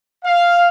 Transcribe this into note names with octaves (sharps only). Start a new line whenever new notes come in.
F5